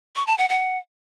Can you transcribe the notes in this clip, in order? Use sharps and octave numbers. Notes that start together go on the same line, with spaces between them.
C#6
A5
F#5
F#5